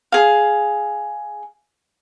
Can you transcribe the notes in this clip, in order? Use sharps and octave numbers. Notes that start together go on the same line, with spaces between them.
G#4 F5